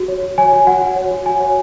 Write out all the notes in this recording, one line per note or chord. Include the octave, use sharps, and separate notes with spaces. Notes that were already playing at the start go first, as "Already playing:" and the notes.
Already playing: F#4
C#5
F#4
C#5 G#5
F#4
F#4 F#5
F#4
C#5
F#4
F#4 G#5
C#5